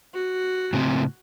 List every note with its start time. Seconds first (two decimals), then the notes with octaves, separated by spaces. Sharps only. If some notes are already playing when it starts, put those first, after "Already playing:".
0.14 F#4
0.73 A2 C#3 C4